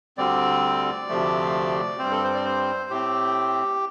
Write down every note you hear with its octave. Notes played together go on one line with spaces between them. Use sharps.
D2 D3 G3 C4 D5
D2 C3 F3 A3
G2 G3 C4 C5
A4
C5
D5
C5
A2 A3 C4 G4